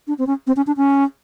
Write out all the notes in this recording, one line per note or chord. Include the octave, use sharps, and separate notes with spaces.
D4
C4
C#4
C4
C#4
D4
C#4